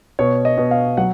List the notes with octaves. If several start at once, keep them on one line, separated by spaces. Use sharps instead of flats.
B2 C#5
D#5
B2
F5
F#3 F#5